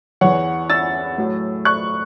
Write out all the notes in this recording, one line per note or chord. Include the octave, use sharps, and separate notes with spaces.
E2 E3 C#5 F#5
E6 A6
A2 F#3
C#6 F#6